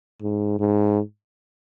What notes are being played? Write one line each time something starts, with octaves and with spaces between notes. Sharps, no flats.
G#2
G#2